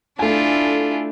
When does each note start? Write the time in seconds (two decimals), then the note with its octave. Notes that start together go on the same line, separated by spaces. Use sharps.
0.19 A3 D4 E4 F4 G#5